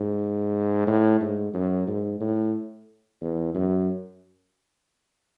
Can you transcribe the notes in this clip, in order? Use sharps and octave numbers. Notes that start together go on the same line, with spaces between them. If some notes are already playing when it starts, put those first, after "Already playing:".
Already playing: G#2
A2
G#2
F#2
G#2
A2
E2
F#2